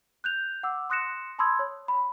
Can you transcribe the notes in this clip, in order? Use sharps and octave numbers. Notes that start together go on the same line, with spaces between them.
F#6 G6 F7
F#5 D6 E6
C6 D#6 F#6 A#6 C#7 E7
A5 B5 C6 D#6 E6 G#6
C#5
B5